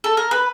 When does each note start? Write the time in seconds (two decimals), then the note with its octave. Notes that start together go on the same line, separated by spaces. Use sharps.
0.04 A4
0.17 A#4
0.31 B4